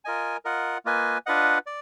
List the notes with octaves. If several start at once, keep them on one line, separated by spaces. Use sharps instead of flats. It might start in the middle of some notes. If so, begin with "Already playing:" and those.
F4 A#4 D#5 G#5
F4 A#4 D#5 F#5
A#3 F4 B4 D#5 G#5
D4 F4 B4 D#5 F#5
D5